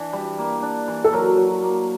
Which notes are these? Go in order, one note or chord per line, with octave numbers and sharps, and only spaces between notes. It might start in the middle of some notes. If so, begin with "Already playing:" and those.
Already playing: E3 D4
G3
A#3
D4
E3
A4
F#3 A#4
F#3
A#3